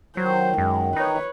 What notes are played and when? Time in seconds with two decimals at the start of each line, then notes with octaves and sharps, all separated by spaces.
0.17 D#3 F#3 C5
0.58 F#2 G#3
0.96 D#4 B4 C#5